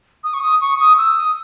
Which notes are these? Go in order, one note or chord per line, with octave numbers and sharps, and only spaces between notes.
D#6
C#6
D#6
C#6
D#6
E6
D#6